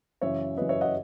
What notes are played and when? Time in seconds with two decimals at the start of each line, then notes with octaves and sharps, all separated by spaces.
0.21 F#2 C#3 E3 C#5 E5
0.57 F#2 C#3 E3 B4 D#5
0.69 C#5 E5
0.81 D#5 F#5